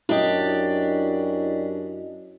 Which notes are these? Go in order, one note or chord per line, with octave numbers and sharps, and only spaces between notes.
F#2 D4 E4 G4 D#5